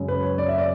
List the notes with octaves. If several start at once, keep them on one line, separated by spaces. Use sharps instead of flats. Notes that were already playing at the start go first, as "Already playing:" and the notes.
Already playing: F#2 C#3 G#3
B4
C#5
D5
E5
D5